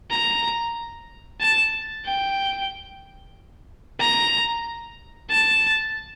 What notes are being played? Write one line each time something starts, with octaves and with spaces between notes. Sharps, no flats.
A#5
A5
G5
A#5
A5